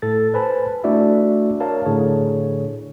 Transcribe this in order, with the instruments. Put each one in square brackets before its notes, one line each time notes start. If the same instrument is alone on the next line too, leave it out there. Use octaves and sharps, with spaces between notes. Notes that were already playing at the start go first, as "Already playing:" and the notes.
[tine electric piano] A2 A4 A6
B4 C5 G#5 A5 B5
A3 D4 E4 F#4 D5 E5
A#4 C#5 F5 A5
A2 D3 G#4 C#5